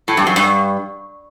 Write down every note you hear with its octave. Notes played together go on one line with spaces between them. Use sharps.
A2
G2
F#2
G2